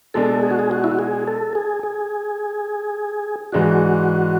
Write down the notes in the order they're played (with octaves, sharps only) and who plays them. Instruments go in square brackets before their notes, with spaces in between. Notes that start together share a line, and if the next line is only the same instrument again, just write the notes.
[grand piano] B2 G#3 D4 [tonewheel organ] A4
[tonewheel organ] G#4
F#4
G#4
F#4
E4
F#4
G#4
A4
G#4
G#4
[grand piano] G#2 E3 G#3 D4 [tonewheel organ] F#4